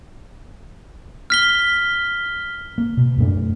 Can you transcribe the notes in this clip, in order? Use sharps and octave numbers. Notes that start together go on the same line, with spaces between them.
F6 B6 G7
A#3
B2
F#2 B2 A3 D4